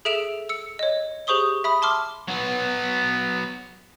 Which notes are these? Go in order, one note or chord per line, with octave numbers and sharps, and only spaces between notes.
G#4 A4 E5 D7 E7 F7
E6 C#7
C#5 D#5
G4 G#4 C5 C#6 D#6 G7
E5 B5 D#6
A5 C6 D6 F6
F#3 B3